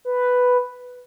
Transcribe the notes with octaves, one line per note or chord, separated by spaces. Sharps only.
B4